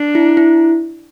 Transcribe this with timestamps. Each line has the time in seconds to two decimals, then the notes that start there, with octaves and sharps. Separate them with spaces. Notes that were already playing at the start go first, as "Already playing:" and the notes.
Already playing: D4
0.15 E4
0.37 E4